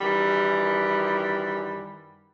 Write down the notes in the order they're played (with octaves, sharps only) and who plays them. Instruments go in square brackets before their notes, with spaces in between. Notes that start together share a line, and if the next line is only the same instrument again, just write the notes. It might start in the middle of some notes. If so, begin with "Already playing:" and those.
[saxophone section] F#2 D#3 E3 G3